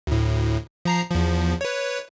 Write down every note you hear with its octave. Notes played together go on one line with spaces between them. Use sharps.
D2 A2
F3 A#5 C7
E2 F3
B4 C#5